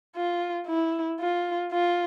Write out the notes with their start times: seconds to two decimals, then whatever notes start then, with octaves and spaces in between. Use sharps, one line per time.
0.16 F4
0.67 E4
1.20 F4
1.71 F4